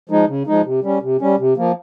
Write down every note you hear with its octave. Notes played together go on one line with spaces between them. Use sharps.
F3 G#3 D#4
C#3
F3 G#3 D#4
C3
G3 C#4
C3
G3 C#4
C3
F3 A#3